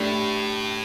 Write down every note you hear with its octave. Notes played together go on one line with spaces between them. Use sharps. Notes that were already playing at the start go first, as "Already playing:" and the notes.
Already playing: A2 A3 D4 G4